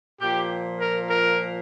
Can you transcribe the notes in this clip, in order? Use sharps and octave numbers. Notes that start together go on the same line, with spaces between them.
A#2 F3 G4
A#4
A#4